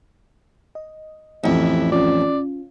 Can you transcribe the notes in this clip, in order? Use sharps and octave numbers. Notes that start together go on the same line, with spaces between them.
D#5
A1 F2 E4
C#4 F4 D5